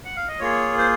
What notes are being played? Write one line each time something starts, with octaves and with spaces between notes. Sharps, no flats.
F#5
F5
D#5
A#3 F4 G#4 C#5
C5